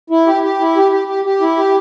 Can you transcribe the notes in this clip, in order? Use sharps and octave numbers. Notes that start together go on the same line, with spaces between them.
E4
G4
G4
E4
G4
G4
G4
G4
E4
G4